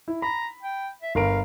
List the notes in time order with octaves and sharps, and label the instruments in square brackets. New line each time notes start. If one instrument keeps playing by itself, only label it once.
[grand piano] E4
[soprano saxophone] A#5 [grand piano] B5
[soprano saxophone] G5
E5
[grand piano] G1 A#4 D7 [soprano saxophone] F5